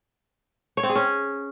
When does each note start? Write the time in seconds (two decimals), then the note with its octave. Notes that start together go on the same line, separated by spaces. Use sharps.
0.77 C#5
0.83 C4
0.89 G#4
0.96 C#4